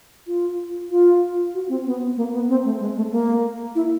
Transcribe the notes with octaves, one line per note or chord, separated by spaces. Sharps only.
F4
F4
F#4
C4
B3
A#3
B3
C4
A3
G#3
A3
A#3
E4